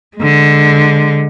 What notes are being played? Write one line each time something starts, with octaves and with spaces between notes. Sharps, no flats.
D3 G#3